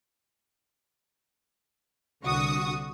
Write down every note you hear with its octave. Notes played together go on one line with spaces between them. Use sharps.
C2 D3 F#4 C#6 D#6